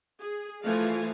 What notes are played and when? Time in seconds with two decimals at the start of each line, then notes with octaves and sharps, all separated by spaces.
0.21 G#4
0.64 E3 F3 A3 F4 F5 G#5